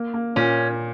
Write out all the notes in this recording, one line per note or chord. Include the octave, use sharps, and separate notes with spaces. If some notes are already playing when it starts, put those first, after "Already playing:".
Already playing: A#3
A#3
A#2 C#4